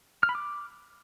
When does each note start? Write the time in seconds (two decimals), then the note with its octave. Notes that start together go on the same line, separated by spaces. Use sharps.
0.23 F6
0.29 B5
0.35 D6